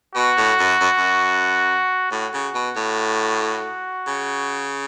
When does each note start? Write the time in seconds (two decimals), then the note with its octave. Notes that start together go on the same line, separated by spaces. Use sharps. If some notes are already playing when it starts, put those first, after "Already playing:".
0.15 B2 F#4
0.37 A2
0.59 F#2
0.81 F#2
0.97 F#2
2.11 A2 F#4
2.34 C#3
2.54 B2
2.76 A2
4.07 C#3